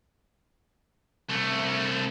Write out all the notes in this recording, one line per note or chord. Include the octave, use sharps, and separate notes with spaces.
C2 A3